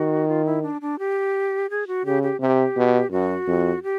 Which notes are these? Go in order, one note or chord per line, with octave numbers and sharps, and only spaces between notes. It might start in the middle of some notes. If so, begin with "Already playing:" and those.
Already playing: D#3 F#4
F4
E4
D4
D4
G4
G#4
F#4
C#3 G4
G4
C3 G4
B2
F#2 F#4
F2
G4